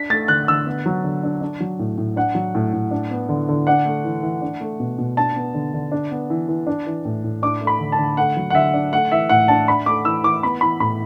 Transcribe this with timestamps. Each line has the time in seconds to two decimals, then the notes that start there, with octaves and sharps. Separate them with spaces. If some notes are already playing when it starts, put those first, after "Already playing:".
Already playing: D4 B6
0.10 A3 A6
0.28 D3 F#6
0.48 D3 E6
0.66 B3
0.86 F#3
1.04 D3
1.23 D4
1.41 D4
1.60 F#3
1.79 A2
1.98 A2
2.16 D4 F#5
2.35 F#3
2.55 A2
2.73 A2
2.91 D4
3.11 B3
3.29 D3
3.49 D3
3.67 D4 F#5
3.85 A3
4.04 E3
4.23 E3
4.42 D4
4.61 A3
4.80 B2
4.98 B2
5.17 D4 A5
5.36 B3
5.54 D3
5.74 D3
5.92 D4
6.11 B3
6.30 E3
6.49 E3
6.67 D4
6.87 E3
7.05 A2
7.24 A2
7.43 D4 D6
7.61 A3
7.67 B5
7.79 D3
7.92 A5
7.98 D3
8.17 A3 F#5
8.37 F#3
8.50 F#5
8.54 D3 E5
8.74 D4
8.92 A3 F#5
9.12 E3 E5
9.29 A2 F#5
9.48 D4 A5
9.68 D4 B5
9.86 A3 D6
10.05 E3 E6
10.24 E3 D6
10.43 B3 B5
10.61 E3 B5
10.80 A2 B5